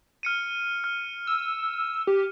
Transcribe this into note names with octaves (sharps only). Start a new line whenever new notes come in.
F6 C#7 D#7
F6
E6
G4